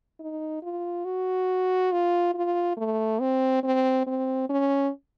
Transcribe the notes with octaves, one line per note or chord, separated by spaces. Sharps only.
D#4
F4
F#4
F4
F4
A3
C4
C4
C4
C#4